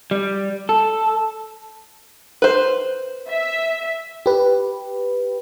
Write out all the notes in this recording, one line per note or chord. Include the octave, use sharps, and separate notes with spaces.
G3
A4
B4 C5
E5
G4 B4